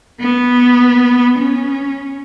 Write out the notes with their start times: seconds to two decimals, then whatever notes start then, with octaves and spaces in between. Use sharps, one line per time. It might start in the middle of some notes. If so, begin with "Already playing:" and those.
0.20 B3
1.39 C#4